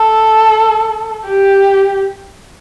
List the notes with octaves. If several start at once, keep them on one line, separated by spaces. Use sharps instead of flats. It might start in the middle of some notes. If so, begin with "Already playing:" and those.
Already playing: A4
G4